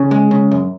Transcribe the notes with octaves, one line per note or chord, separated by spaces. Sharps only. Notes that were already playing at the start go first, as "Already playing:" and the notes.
Already playing: C#3
G#3
C#3
F#2